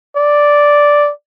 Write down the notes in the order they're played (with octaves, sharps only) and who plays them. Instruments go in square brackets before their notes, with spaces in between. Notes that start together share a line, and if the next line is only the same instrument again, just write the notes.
[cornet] D5